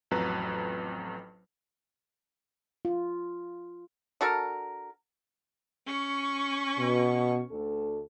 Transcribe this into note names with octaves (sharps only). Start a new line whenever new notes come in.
A1 F2 F#3 B4 A#5
F4
D4 F#4 A4 A#4
C#4 C#6
B2
D2 A4